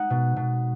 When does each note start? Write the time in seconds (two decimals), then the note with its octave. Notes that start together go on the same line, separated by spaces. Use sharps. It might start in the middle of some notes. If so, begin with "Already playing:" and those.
Already playing: G#3 D#4 F#5
0.10 B2
0.37 B2